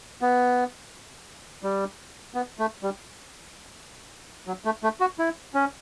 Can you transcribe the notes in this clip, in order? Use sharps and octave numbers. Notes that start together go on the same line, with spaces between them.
B3
G3
B3
A3
G3
F#3
A3
A3
F#4
E4
C#4